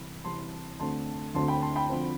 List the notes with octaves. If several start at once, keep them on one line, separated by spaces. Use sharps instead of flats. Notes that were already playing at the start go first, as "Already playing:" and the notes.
Already playing: C2 C3 E3 B5
C2 C3 E3 A5 C6
D2 D3 A3 C4 A5 C6
D2 D3 A3 C4 A5 C6
G5 B5
A5 C6
G5 B5
D3 F3 C4